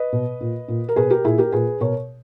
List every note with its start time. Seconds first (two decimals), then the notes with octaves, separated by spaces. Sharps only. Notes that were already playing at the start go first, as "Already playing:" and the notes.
Already playing: B4 D#5
0.12 B2
0.41 A#2
0.68 A#2
0.89 A#4
0.96 B2 G#4 B4
1.10 G4 A#4
1.25 A#2 E4 G#4
1.38 G4 A#4
1.52 A#2 G#4 B4
1.80 B2 A#4 C#5